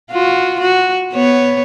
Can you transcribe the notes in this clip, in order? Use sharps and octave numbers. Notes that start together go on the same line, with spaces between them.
F4 F#4
F#4
B3 C#5